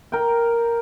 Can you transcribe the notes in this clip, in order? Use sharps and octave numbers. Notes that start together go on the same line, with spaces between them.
A#4 G5